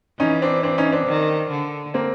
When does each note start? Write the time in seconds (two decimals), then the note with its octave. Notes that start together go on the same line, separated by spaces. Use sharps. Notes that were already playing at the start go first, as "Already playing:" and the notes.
0.19 E3 C#4 D#4
0.42 C4 D4
0.63 C4 D4
0.78 C#4 D#4
0.92 C4 D4
1.06 D#3
1.50 D3
1.94 A#3 C4